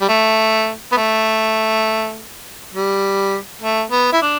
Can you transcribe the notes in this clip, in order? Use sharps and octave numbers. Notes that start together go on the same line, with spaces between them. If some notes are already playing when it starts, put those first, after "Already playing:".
G3
A3
B3
A3
G3
A3
B3
E4
D4